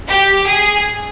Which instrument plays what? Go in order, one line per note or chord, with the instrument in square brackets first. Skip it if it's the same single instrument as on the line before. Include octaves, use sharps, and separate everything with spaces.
[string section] G4
G#4